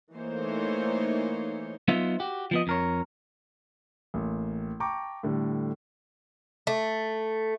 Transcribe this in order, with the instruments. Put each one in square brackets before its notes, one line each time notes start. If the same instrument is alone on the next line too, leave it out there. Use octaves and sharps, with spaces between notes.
[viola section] E3 A3 A#3 D#4 C5 C#5
[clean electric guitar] F#3 B3 D#4 F4 C5 E5
F#4 G4
F3 B3 D#5
F2 A#4 C#5
[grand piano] A1 A#3
G5 A5 A#5 C#6 D6
A2 D3 G3
[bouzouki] A3